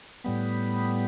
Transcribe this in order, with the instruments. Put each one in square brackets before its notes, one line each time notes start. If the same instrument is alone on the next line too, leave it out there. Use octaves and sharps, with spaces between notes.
[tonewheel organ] A2 G3 B3